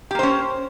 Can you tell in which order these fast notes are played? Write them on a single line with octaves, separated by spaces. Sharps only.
G4 A#3 C5 C#4